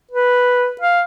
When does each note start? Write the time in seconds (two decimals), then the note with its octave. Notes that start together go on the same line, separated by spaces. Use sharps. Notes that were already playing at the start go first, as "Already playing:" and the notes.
0.11 B4
0.81 F5